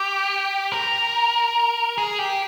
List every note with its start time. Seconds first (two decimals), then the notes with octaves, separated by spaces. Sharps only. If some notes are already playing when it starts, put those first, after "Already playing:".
Already playing: G4
0.72 A#4
1.98 G#4
2.19 G4